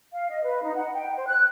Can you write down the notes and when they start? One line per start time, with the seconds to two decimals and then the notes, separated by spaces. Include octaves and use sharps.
0.12 F5
0.30 D#5
0.44 B4
0.63 D#4
0.75 F#5
0.94 G5
1.16 C5
1.28 F#6